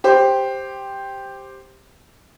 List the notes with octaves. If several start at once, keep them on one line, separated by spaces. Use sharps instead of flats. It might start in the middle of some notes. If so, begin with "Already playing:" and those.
G4 C5